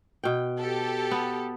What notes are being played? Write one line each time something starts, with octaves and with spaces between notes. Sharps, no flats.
B2 G5
G4 A4
B3